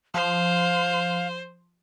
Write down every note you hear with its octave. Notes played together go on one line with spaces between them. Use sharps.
F3 C5 F5